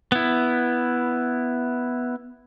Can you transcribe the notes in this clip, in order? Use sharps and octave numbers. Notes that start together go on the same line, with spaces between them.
B3 E4